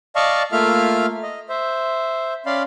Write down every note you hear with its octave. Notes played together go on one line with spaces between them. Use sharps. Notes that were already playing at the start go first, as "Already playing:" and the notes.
D5 D#5 F5 A5 C#6
A3 A#3 F4 E5 F5 F6
D#5
C5 E5
C#4 D5 F5 B5 C6